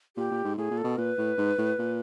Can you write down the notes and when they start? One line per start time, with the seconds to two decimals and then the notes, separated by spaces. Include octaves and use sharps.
0.17 A#2 G4
0.31 A#2
0.44 G#2
0.57 A2 G#4
0.71 A#2
0.78 A4
0.84 B2
0.98 A#2 B4
1.18 A2
1.38 G#2
1.58 A2
1.79 A#2